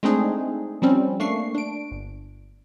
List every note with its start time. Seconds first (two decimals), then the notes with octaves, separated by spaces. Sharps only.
0.03 G#3 A3 C4 D4 D#4 G#4
0.82 F3 G3 C4 C#4
1.20 A3 A#3 D4 C#6 C7
1.55 D4 D7
1.92 G1